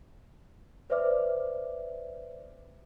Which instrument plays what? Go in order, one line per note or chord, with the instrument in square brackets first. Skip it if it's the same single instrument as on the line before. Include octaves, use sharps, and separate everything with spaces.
[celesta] B4 C5 D5 E5 D6 F6